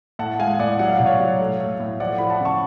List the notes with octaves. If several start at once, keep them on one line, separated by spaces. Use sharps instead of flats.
A2 F#5 A5
G#3 F5 G#5
A2 D5 F#5
F#3 F#5
F5
B2 D5
C#5 F5
F#3
A3
A3
A2
F3 D5 F#5
F3 B5
F#5 A5
C#3 A5 C#6